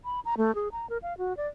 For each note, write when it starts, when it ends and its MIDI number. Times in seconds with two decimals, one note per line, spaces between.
0.05 0.20 83
0.25 0.35 82
0.37 0.54 57
0.55 0.68 68
0.72 0.89 82
0.90 0.98 70
1.03 1.17 77
1.18 1.36 66
1.37 1.47 74